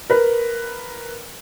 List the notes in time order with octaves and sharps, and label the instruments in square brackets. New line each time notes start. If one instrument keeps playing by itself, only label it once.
[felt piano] A#4 B4